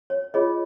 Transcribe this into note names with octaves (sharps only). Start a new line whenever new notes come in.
C#5
F4 G#4 C#5 D#5